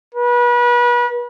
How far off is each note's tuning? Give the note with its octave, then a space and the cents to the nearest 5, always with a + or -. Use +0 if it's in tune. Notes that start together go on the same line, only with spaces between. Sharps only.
B4 -30